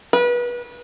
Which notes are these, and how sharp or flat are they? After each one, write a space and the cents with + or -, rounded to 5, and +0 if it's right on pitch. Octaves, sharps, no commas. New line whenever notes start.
B4 -30